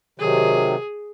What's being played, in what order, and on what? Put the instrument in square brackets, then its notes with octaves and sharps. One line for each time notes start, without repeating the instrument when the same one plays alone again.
[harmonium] C3 D#3 F#3 [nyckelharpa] G#4